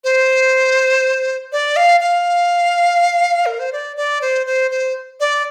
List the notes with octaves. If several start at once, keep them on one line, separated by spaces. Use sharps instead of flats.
C5
D5
F5
F5
A#4
C5
D5
D5
C5
C5
C5
D5